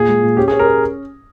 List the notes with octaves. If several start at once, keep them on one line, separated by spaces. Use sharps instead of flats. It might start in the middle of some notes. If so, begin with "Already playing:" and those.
Already playing: A#2 G#4
G#3
A#2
C#4 G4
G#4
C#4
A#4
C#4